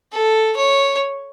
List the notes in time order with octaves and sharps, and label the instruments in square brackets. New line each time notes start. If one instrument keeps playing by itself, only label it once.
[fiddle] A4
C#5